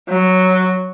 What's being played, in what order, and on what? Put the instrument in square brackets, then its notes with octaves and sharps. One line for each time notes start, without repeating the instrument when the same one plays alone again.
[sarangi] F#3